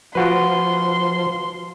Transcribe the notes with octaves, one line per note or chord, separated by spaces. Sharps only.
F3 F4 F#4 B4 C6